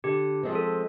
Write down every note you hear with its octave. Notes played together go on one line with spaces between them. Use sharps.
D3 G4
F3 G#3 C4
A4